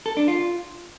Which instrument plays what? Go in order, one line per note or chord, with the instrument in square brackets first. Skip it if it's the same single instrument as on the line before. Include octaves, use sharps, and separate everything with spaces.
[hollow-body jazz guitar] A4
D4
F4